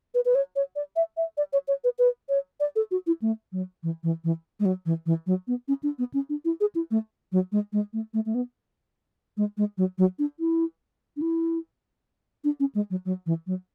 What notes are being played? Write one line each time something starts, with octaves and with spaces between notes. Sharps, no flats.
B4
B4
C#5
C#5
D5
E5
E5
D5
C#5
C#5
B4
B4
C#5
D5
A4
F#4
E4
A3
F#3
E3
E3
E3
G#3
F#3
E3
E3
F#3
B3
C#4
D4
B3
C#4
D4
E4
G#4
E4
A3
F#3
G#3
G#3
A3
A3
A3
B3
G#3
G#3
F#3
F#3
D4
E4
D4
E4
D4
C#4
G#3
F#3
F#3
E3
F#3